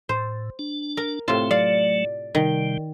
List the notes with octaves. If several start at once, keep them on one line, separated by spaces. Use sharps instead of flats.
A2 C5
D4
A#4
A2 C3 A3 C4 F4
F#3 A3 D5 F5
C3 D#3 G3